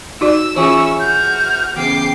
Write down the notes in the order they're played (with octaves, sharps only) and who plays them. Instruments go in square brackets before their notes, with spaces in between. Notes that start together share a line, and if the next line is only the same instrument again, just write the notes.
[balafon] D#4 F#4 D5 [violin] E6
[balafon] E3 F4 [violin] C#4 E6 [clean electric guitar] E4 G#4 [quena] C#6
[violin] F#4 F6 [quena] G6
[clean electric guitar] E2 C#3 [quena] G5 [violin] D6 C7